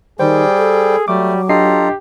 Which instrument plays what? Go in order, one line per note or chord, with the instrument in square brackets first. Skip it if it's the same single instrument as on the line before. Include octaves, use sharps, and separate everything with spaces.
[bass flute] D#3 [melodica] G3 G5 [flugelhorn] G#4 [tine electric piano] C5
[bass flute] A4
[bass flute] F#3 [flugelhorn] G3 [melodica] A3 [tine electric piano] D6
[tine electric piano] D4 D#5 C7 [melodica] F4 A4 A#5 [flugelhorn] G4